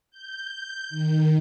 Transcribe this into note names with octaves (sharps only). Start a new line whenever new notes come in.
G6
D#3